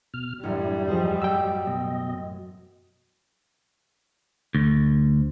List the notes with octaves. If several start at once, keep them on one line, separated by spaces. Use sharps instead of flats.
B2 F6
E1 A1 F#2 G3 D4 E4
E2 F3 G#4 C5 D#5
F#3 F#4 G5 E6
B2 D#5
D2